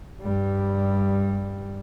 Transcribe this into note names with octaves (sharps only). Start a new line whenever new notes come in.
G2 G3